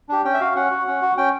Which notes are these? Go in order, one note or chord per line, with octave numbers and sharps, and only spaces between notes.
D4 G4
C#4 G5
E5
F#4 F5
C#4 F#5
F#4
C#4
F#4
C#4 G5